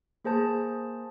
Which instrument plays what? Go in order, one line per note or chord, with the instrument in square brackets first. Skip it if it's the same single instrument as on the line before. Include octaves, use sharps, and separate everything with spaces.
[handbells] A#3 G#4 C5 A5